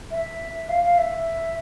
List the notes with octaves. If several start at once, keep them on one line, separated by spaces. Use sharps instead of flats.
E5
F5
F5
E5